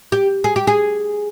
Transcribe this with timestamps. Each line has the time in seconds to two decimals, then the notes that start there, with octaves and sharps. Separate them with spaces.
0.12 G4
0.44 G#4
0.56 G4
0.67 G#4